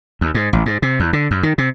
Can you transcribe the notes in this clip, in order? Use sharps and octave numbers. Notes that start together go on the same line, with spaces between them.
D#2
G#2
A1
G#2
C3
E2
D3
F#2
D#3
C3